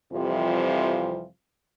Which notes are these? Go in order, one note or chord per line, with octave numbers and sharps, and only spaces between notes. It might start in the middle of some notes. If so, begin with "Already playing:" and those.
F2 C3 E3 F3 G3 F4